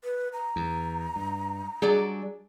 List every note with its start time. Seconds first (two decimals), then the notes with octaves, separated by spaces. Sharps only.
0.04 B4
0.33 A#5
0.56 E2
1.16 G2
1.82 F#3 G3 D4 G#4 D5